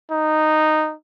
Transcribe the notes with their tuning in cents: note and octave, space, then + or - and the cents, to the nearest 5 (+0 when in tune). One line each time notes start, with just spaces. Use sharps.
D#4 -10